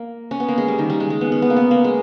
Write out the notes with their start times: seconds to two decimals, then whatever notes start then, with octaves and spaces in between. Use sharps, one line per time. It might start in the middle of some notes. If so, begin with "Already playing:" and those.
Already playing: A#3
0.31 C#4
0.40 B3
0.48 A#3
0.58 G#3
0.68 G3
0.78 D#3
0.90 G3
1.00 G#3
1.10 G#3
1.21 B3
1.32 C#4
1.42 B3
1.50 A#3
1.56 B3
1.71 A#3
1.84 G#3